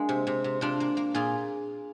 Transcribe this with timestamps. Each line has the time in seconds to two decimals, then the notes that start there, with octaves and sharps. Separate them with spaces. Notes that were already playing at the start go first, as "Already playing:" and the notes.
Already playing: G#3 A#3 D4
0.09 C3
0.27 C3
0.44 C3
0.61 C3 D4 F4
0.80 A#3
0.97 A#3
1.14 A#2 F4 G#4